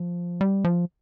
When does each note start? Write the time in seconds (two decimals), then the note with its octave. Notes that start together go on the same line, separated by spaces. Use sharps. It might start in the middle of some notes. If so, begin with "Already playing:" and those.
Already playing: F3
0.41 G3
0.64 F3